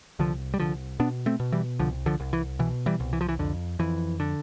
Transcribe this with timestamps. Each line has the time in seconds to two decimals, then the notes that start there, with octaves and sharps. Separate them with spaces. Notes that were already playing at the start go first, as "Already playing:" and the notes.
0.19 C2 D3 F3
0.54 G3
0.60 C2 D3 F3
1.00 B2 B3 D4
1.26 A3 C4
1.40 B2
1.52 E3 G3
1.79 C2 D3 F3
2.06 D3 F3
2.20 C2
2.33 E3
2.59 B2 E3
2.86 E3 G3
3.00 C2
3.13 E3
3.21 F3
3.29 E3
3.39 F2 D3
3.79 F2 E3
4.20 D3